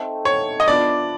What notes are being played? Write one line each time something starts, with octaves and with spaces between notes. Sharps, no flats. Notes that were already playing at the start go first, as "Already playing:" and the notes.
Already playing: A3 C4 D#4
C#5
D#5
B3 D4 F4 D5